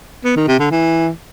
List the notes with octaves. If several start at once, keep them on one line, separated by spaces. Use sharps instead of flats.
B3
D#3
C3
D3
E3